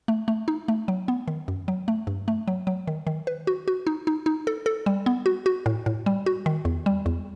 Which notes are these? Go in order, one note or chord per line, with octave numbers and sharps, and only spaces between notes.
A3
A3
D#4
A3
F#3
B3
D#3
F#2
F#3
A3
G2
A3
F#3
F#3
D#3
D#3
B4
F#4
F#4
D#4
D#4
D#4
A4
A4
G3
B3
F#4
F#4
A2
A2
G3
F#4
D#3
E2
G3
E2